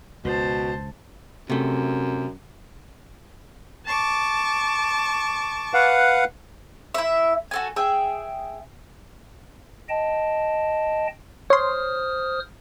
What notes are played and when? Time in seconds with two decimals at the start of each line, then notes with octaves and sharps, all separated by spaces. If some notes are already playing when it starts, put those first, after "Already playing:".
0.25 C#2 B2 C5 A5
1.50 F#2 C3 A3
3.86 A5 C#6 D6
5.74 B4 F5 F#5
6.94 E4 E5
7.51 F#4 A4 G#5
7.76 G#4 E5 G5
9.89 D#5 G5 A5
11.50 C5 C#5 C6 D#6 F6